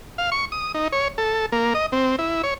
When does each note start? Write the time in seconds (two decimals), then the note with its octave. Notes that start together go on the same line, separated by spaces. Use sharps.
0.18 F5
0.32 C#6
0.52 D#6
0.74 D#4
0.92 C#5
1.18 A4
1.52 A#3
1.75 D#5
1.92 C4
2.19 E4
2.43 C#5